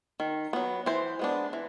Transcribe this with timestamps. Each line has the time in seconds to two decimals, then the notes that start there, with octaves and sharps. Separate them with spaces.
0.20 D#3
0.53 F#3 B3
0.86 E3 C5
1.19 G#3 B3 D4
1.53 E3